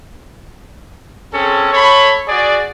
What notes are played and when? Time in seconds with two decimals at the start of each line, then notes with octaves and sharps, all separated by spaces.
1.33 C4 C#4 G#4 A4
1.73 A4 C#5 B5
2.28 F#4 G#4 D5